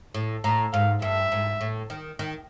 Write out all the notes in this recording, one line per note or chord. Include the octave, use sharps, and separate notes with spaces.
A2
A2 A#5
G#2 F5
G2 E5
G#2
A2
D#3
D#3